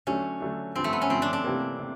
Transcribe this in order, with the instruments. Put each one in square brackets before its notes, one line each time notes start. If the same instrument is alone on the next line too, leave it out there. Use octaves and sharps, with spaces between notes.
[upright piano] D3 F#3 A3 D4 [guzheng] C#4
[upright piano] D3 F#3 A3 D4
[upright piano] G2 D3 F3 [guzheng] C4
[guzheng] A3
B3
C#4
[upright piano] G2 D3 F3 [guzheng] C4
[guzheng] D4
D4
[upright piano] C3 E3 G3 A#3
C3